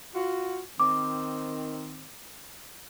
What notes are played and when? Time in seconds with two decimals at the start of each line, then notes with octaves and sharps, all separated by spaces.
0.14 F4 F#4
0.80 D#3 C4 D6